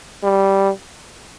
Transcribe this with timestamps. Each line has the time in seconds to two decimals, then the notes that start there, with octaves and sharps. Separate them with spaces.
0.24 G3